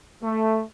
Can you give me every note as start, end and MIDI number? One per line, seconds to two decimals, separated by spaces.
0.22 0.61 57